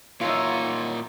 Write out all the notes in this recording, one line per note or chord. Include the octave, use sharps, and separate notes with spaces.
F#2 A#2 E3 D#4 F4 C#5